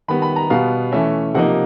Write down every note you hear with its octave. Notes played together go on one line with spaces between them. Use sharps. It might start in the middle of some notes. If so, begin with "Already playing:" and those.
D#3 G3 B3 B5
B5
A#5
B2 G3 B3 F5
E3 A3 C#4 E5
C3 F3 A#3 D#4 F#5